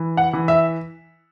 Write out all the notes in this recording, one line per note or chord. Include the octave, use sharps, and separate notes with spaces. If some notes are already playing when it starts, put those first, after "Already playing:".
Already playing: E3
F#5
E3
E5